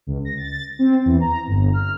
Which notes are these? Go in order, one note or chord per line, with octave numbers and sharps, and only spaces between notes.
C#2
A#6
A6
C4
E2
A#5
G1
F6